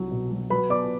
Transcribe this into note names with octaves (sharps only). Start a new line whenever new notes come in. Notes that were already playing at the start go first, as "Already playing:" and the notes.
Already playing: C2 F#3
B2
F#3
F#3 B4 B5
B3 D5 D6